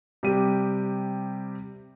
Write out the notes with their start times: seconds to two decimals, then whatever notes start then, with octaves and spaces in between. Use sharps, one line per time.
0.23 C3 G3 G4 D#7